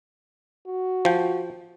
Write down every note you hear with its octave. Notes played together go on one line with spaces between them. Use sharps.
F#4
F3 G5